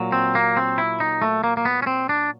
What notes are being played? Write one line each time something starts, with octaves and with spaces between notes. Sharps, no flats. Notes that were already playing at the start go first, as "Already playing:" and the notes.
Already playing: A#2 F#3
C4
A#3
C4
E4
D#4
A3
A#3
A#3
B3
C#4
C4
D4